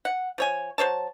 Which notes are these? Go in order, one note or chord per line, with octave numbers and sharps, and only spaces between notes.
F#5
F3 C#5 G#5
F#3 C5 C#5 A5